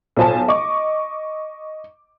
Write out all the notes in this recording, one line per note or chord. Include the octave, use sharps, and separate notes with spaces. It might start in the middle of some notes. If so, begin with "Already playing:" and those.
B1 F4 C5 G#5 A5
D#5 C#6 D6